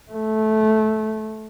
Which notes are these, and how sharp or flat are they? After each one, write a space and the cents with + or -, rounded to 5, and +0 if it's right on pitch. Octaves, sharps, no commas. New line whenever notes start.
A3 -15